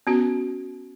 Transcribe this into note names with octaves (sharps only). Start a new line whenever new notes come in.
B3 C#4 F#4